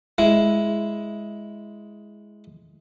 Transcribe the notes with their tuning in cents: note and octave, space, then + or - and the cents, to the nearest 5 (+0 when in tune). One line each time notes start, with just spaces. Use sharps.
G#3 +5 E4 +0